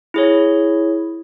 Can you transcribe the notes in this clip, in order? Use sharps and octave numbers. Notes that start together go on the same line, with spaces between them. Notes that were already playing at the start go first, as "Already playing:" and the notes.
E4 G#4 C#5